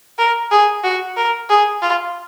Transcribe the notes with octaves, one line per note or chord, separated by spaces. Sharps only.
A#4
G#4
F#4
A#4
G#4
F4